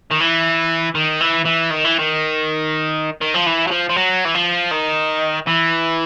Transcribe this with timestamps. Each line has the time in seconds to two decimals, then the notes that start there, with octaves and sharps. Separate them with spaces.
0.11 D#3
0.20 E3
0.95 D#3
1.20 E3
1.45 E3
1.70 D#3
1.84 E3
1.99 D#3
3.22 D#3
3.34 F3
3.47 E3
3.67 F#3
3.71 F3
3.89 F3
3.96 F#3
4.25 E3
4.34 F3
4.71 D#3
5.47 E3